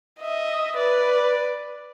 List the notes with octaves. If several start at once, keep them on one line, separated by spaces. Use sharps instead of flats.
D#5 E5
B4 D5